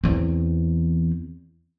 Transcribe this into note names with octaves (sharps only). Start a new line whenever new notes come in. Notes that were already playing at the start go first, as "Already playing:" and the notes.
E2 C4